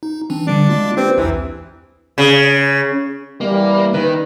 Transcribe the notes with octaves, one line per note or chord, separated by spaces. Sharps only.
D#4
E3 C4 D4
D3 G3 D4
G#3 A#3 F4
C4 D4 G4 B4
B1 E2 E3
C#3
E3 G3 A#3
D#3 B4